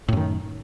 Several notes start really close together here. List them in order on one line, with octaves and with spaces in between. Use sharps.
A2 F#2 D#3